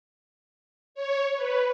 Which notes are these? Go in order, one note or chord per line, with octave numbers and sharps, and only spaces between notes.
C#5
B4